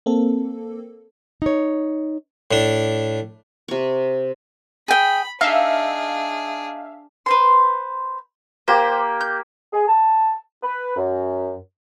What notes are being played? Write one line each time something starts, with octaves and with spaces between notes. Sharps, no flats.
A#3 C4 A4
D#4 C#5
A2 D4
C3 C#6
G#4 G5 B5
D4 D#4 G#4 E5 F5
B4 C5 C6
A#3 G4 C5
G6
G#4
A5
B4
F#2